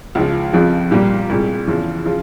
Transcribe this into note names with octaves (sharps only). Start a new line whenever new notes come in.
C#2 C#3 F3
F2 C#3 F3
A#2 G3 A#3
C2 A#2 G#3
E2 C#3 F3
C#3 F3